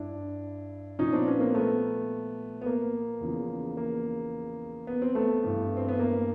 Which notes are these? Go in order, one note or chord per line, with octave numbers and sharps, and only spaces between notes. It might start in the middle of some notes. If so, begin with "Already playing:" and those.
Already playing: G2 D4 E4
A#2 F3 C#4 D#4
C4 D4
B3 C#4
A#3 C4
A3 B3
B3
A#3
E2 C#3 F3
A#3
B3
C4
A3 B3
G2 E3
C4
B3
A#3